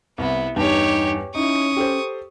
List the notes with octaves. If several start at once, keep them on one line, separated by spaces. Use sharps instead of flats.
C2 B3 E4
E2 G2 D#4 G4 C#5
C#4 D#4 E4 C#6 D#6
G4 A4 C5